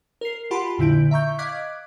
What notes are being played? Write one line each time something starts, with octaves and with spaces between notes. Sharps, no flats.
A#4 C7
F4 G4 F#5 A5 B5 C6
F2 A#2 D3 E4 G6 D7
E5 A#5 C#6 G6
D#5 F5 D6 F#6 G#6 B6